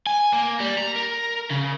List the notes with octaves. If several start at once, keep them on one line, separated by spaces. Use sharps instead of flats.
G#5
A#3
G3
A#5
A#4
C#3